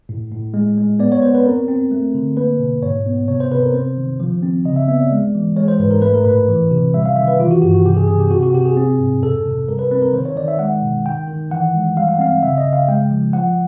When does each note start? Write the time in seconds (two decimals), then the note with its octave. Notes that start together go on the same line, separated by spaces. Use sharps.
0.09 A2
0.32 A2
0.54 G#3
0.78 G#3
0.99 B3 D5
1.12 C#5
1.22 B3 C5
1.35 B4
1.46 C4 A#4
1.68 C4
1.91 A3
2.14 D3
2.37 A#3 B4
2.60 B2
2.82 G#2 C#5
3.06 B3
3.28 C3 C#5
3.40 C5
3.52 C3 B4
3.63 A#4
3.73 C4 C5
3.98 D#3
4.20 F3
4.43 C4
4.65 C#3 D#5
4.76 E5
4.88 B3 E5
5.00 D5
5.11 G#3
5.35 E3
5.57 G#3 C#5
5.68 C5
5.79 G#2 B4
5.91 A#4
6.02 A3 B4
6.14 A#4
6.25 A2 B4
6.48 E3
6.71 C3
6.94 G3 E5
7.06 F5
7.16 D#3 E5
7.28 B4
7.40 E3 F4
7.51 F#4
7.62 G2 G4
7.74 F#4
7.86 C3 G4
7.97 G#4
8.08 C3 G#4
8.20 G4
8.31 C3 F#4
8.43 F#4
8.53 C3 G4
8.66 G#4
8.77 C4 G#4
8.99 G#2
9.22 F2 A4
9.45 C3
9.68 G3 A#4
9.79 B4
9.91 C4 B4
10.02 A#4
10.13 D#3 C5
10.25 C#5
10.36 D#3 D5
10.48 E5
10.59 G#3 F#5
10.82 B2
11.06 D#3 G5
11.27 D#3
11.51 E3 F#5
11.74 G#3
11.97 G3 F5
12.09 F#5
12.19 C4 F5
12.43 C#3 E5
12.58 D#5
12.66 C#3
12.73 F5
12.88 G#3 G5
13.10 F3
13.33 F3 F#5